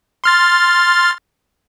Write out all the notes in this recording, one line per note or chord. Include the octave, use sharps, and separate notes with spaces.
C6 F6 A6